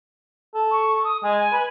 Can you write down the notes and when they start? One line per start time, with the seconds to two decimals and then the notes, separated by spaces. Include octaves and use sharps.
0.55 A4
0.71 C#6
1.04 D#6
1.23 G#3 G#5
1.53 B4